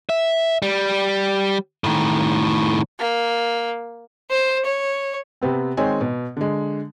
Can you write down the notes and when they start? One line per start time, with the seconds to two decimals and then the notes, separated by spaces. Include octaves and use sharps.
0.10 E5
0.62 G3
1.84 A2 D#3
2.99 A#3
4.30 C5
4.65 C#5
5.41 C3 B3 C4
5.77 D#3 G#3 C4 C#5 G#5
6.01 B2
6.37 D3 G#3